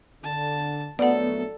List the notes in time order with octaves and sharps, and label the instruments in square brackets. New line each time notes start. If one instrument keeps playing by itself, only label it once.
[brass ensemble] D3 [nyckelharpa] A5
[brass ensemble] A#1 F#3 A3 [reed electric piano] B3 [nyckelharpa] A4 [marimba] D5 F#5